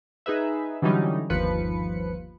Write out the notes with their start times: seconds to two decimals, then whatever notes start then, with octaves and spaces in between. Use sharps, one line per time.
0.26 D#4 G#4 B4 E5
0.82 D3 E3 F#3 G3 C#4 D#4
1.30 G1 D#2 F3 B4 C#7